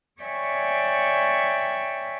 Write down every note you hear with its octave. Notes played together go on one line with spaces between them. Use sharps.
C#5 D5 E5 G5 G#5 C#6